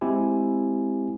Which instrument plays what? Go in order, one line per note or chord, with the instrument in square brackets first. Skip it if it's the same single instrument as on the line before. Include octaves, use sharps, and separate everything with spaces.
[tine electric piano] G#3 C4 E4 G4 G#5